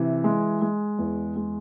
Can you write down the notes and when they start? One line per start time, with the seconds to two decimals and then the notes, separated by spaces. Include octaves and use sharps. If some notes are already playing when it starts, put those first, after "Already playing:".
Already playing: C3 E3
0.24 G#3
0.62 G#3
0.99 E2
1.36 G#3